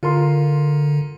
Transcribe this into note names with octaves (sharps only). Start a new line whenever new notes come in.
D3 F4 A#4 C6